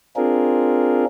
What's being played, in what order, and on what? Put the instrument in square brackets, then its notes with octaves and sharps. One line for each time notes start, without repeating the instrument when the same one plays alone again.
[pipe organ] C4 D4 F4 G#4 A#4